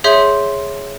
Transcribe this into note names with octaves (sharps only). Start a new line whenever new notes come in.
G#4 C#5 E5 C6 G6